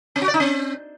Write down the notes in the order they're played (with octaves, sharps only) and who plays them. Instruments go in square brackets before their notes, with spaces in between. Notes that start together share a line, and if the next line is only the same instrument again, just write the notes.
[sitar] C4
F#4
D5
D#4
C4